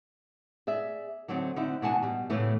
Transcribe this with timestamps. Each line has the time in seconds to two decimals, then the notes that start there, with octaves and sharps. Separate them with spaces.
0.67 G#4 D5 E5
1.28 D3 F#3 A3 C4 D#4
1.56 D3 C4 D#4 E4
1.82 B2 E3 D4 F#5 G#5 A5
2.02 B2 G3
2.30 A2 C#3 E3 A3